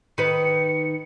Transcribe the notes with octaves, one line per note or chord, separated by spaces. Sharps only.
D#3 B4 C#7